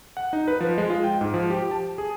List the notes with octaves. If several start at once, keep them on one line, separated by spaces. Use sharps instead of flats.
F#5
D#4
B4
F3
G#3
F4
G5
G#2
F3
G4
A5
G#4